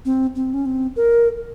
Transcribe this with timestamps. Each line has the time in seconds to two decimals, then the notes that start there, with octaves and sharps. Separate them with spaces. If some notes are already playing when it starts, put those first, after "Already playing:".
0.05 C4
0.35 C4
0.54 C#4
0.66 C4
0.96 A#4